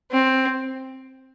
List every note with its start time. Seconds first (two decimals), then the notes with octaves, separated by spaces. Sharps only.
0.11 C4